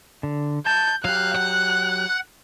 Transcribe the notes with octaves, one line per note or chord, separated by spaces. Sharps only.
D3
A5 G6
F#3 G4 F5 F#6
F#5